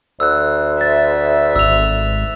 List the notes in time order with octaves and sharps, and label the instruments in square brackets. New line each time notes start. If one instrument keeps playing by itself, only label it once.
[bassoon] D2 [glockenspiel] E6 F#6
[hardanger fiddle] E5 [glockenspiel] A6
[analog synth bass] G#1 [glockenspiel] E6 F7